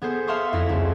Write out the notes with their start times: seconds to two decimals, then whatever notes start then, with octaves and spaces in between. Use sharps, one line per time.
0.02 B3 G#4 A4 C5
0.27 E5 F5 A5 C6 C#6 D#6
0.53 F2 E4 F#4 E5
0.69 C#2